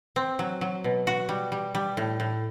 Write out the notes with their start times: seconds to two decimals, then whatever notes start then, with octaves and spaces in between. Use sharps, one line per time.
0.16 C4
0.39 F#3
0.61 F#3
0.84 B2
1.07 F#4
1.29 G3
1.52 G3
1.75 G3
1.97 A2
2.20 A2